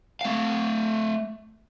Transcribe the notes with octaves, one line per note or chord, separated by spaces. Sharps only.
A3 F5